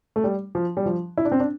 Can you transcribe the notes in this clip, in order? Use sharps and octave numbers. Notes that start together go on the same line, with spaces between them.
A3
G3
F3
G3
F3
E4
D4
C4
D4